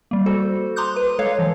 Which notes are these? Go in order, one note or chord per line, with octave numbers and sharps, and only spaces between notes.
G3 A#3
F#4 A4 C5
A#5 C6 D6 D#6 F#6 G6
B4
G#3 A4 C#5 F5
E3 F3